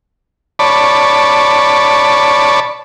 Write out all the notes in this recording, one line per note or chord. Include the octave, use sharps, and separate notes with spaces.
C#5 D5 A5 B5